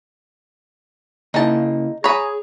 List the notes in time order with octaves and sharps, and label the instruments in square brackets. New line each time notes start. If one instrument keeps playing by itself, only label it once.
[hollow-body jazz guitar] C#3 A#3 E4 [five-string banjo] D#4 A5
[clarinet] G#4 [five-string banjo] C#5 B5 [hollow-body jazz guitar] G#5 A#5